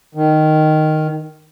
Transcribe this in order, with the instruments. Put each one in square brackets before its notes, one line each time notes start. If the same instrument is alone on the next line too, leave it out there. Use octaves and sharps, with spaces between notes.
[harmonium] D#3